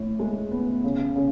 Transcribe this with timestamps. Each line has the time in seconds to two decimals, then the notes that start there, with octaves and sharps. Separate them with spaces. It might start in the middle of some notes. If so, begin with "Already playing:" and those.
Already playing: A2
0.19 G#3
0.51 B3
0.84 C#3
1.16 C#3